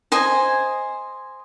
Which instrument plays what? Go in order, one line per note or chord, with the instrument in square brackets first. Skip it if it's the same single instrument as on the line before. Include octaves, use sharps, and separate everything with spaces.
[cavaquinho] C5 D#5 G#5